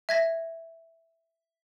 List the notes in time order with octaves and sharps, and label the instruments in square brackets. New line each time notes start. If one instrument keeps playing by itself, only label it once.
[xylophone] E5 G#6 A#6